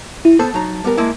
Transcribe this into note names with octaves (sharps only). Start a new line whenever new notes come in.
E4
B3 A4 C5 A5
F#3 D#4 A#5
G3 B3 A#4
G#3 A#3 E4